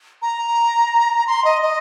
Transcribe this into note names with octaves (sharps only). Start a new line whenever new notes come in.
A#5
C6
D#5
D#5